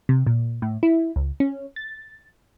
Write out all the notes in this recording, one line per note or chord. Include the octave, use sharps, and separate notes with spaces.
C3
A#2
A2
E4
C#2
C#4
A6